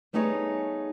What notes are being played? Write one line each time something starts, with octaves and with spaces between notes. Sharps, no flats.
G3 A3 B3 D#4 G#4 C#5